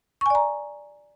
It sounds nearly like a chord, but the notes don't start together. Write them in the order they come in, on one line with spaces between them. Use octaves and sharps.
C#6 G#5 D5 A#5